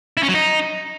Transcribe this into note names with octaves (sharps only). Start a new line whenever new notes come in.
E4
C#4
F#3
D#4